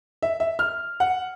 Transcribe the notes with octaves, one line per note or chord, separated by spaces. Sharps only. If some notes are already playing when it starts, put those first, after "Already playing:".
E5
E5
F6
F#5